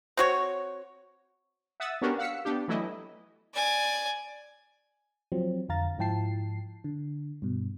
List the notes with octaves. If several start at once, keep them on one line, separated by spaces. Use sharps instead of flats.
C4 F#4 C#5
E5 F#5 D#6 E6 A6
B3 C#4 D4 F#4 G4 A#4
F5 F#5 E6 B6 C#7
B3 D4 G4
E3 F#3 A3 E4 D#5
D5 G#5
F3 F#3 C4
F2 D3 F5 A#5 A6
G#2 F3 E4 G5 A5 C7
D3
G2 B2